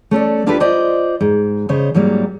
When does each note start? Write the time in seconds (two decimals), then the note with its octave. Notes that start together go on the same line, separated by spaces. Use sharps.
0.11 A3 C#4 A4 D5
0.46 A#3 D4 F4 G4 A4 B4
0.60 F4 C5 D5 D#5
1.21 G#2
1.69 C#3 C5 C#5 D#5
1.94 G#2 F#3 G3 A#3